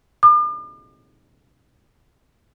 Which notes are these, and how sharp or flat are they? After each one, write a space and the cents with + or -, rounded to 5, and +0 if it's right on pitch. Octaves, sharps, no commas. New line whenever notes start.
D6 +45